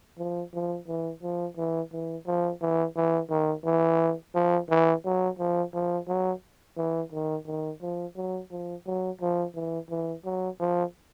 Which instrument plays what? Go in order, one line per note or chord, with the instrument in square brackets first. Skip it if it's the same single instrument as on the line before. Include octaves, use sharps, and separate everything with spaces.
[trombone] F3
F3
E3
F3
E3
E3
F3
E3
E3
D#3
E3
F3
E3
F#3
F3
F3
F#3
E3
D#3
D#3
F3
F#3
F3
F#3
F3
E3
E3
F#3
F3